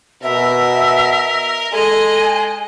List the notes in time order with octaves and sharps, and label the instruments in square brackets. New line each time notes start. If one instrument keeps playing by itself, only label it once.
[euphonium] B2 [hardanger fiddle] A#4 [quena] E5
[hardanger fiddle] G#3 D#5 [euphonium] A4 [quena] G#5